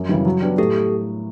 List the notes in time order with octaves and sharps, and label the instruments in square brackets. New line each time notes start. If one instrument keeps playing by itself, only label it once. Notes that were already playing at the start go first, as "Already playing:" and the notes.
Already playing: [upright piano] F#2
C#3 E3 G3
F#3
B3 D4 G4
[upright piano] A2 [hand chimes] G4 A4